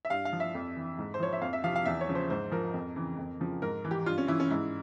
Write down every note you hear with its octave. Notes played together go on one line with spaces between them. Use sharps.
E5
G2 F5
F5
F3
E5
F2
E3
G#2
C5
F3 C#5
E5
F2 F5
E5
C3 F3 F5
F5
E2 E5
C#5
C#3 F3
C5
G#2 C5
F3 A#4
F2
C#3 E3
F2
C#3 F3
G#2 A#4
E3
G4
G2 F4
C#4
E3 E4
C#4
G#2 E4